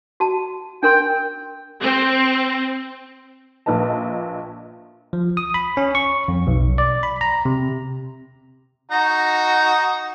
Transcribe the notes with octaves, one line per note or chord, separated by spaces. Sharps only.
F#4 A5
D4 A#4 G5 C6
C4
A#1 A#2 B4 D#5 A5
F3
D#6
B5
C#4
C#6
F2
B1
D5
B5
A#5
C3
D#4 F#4 A#5